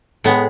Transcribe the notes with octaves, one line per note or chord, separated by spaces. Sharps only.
A2 G#3 B3